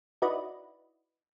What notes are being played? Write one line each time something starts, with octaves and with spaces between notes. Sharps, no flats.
D#4 E4 F#4 B4 D5 D#5